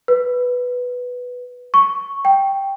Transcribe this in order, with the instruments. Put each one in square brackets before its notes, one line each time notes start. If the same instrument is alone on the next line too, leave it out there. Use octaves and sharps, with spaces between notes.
[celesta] B4
C#6
G5